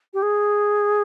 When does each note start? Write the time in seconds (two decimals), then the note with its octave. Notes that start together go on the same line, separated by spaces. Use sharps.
0.14 G4
0.22 G#4